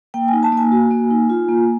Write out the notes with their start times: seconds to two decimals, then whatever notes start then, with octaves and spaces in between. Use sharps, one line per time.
0.14 A#3 G5
0.28 D#4 G#5
0.43 A5
0.52 A#3
0.57 G#5
0.72 F#4
0.91 A#3
1.11 D#4
1.30 F4
1.48 A#3